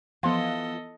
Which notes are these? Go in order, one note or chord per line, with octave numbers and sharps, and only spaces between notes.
E3 F3 B3 F4 A4 D#5